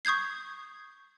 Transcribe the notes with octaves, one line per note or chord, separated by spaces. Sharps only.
C#6 D#6 G6 G#6 C7